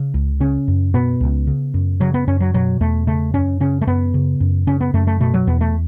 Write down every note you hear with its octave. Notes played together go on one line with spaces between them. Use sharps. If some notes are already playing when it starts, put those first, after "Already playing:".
Already playing: C#3
C#2
C#3 C#4
F#2
B2 B3
C#2
C#3
F#2
C#3 F#3
B3
F#2 C#4
F#3
B2 F#3
E2 A3
C#3 A3
F#2 C#4
C#3 C#4
A3
F#2 B3
C#3
F#2
C#3 C#4
B3
F#2 A3
A3
B2 A3
F#3
E2 B3
A3